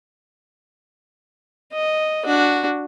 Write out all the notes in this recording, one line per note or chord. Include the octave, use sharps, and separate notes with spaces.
D#5
D4 F#4